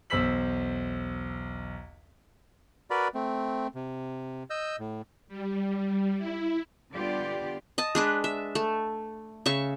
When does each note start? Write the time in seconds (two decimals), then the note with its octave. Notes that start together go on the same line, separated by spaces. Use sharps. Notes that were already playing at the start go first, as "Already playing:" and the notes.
0.10 B1 E2 C5 E6 B6 F#7
2.90 F#4 A#4 B4 D5 B5
3.15 A3 C4
3.75 C3
4.50 D#5 E6 G6
4.79 A2
5.28 G3
6.18 E4
6.93 D3 G3 B3 F4 G4 D5
7.78 D#5 A5
7.95 G#3 D4 B4
8.24 E5
8.55 A3
9.46 C#3 E5 C#6